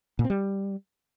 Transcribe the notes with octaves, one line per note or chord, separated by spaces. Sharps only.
A#2
C4
G3